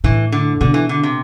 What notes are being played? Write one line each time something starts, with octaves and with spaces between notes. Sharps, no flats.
A2 E3
D3
B2 D3
E3
D3
C3